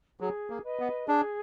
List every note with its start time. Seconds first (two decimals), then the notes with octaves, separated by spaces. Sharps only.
0.20 F#3 G#4
0.50 A#3
0.64 B4 D#5
0.80 B3
1.08 D4 G#4